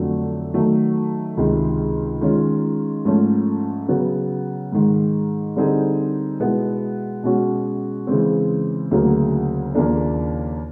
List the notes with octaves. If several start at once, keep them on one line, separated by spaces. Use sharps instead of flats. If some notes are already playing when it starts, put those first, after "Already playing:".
Already playing: F2 D3 F#3 A3 D4
D#3 F#3 A3
C#2 C3 D#3 G#3
D#3 G#3 C#4 F4
G#2 F3 A3 C#4
C#3 F#3 B3
G#2 D#3 G#3
D3 G3 C4 D#4 G#4
B2 G#3 B3 E4
B2 G#3 C#4 F#4
C#3 E3 G#3 C4
D2 C#3 F#3 A#3
D#2 C#3 F3 A#3 D4